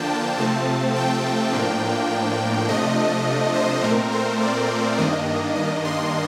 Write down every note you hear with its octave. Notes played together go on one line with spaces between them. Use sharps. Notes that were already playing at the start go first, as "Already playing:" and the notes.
Already playing: D3 F3 A#3 D4 G5 A5
C3 F3 A3 C4 A5
G5
A2 F3 A#3 D4
C3 F3 A3 D4 D#5
C5
A#2 A3 C4 A#4
C5
D5
G2 D#3 A#3 D4 D#5
D#5
C6